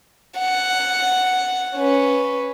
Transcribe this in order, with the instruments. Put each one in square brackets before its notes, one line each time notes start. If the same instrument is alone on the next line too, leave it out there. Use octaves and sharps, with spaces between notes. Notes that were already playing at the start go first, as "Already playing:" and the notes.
[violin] F#5
C#4 B4